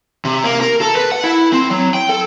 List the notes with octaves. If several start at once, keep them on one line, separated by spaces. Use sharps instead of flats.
C3
A#3
A#4
A4
B4
F#5
E4
C4
F#3
G5
A4